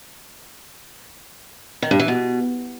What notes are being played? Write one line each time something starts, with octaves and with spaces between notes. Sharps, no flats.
D#3
G2
E3
B2